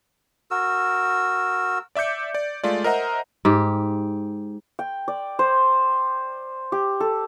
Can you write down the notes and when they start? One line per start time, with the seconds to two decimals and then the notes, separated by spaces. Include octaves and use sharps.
0.51 F#4 A#4 E6
1.95 D5 E5 D6 G6 C#7
2.35 D5
2.64 G#3 A3 F4 D5
2.84 A#4 C5 D#5 E5 F#5 A#5
3.45 G#2 G4
4.79 G5
5.08 D5
5.39 C5
6.72 G4
7.00 A4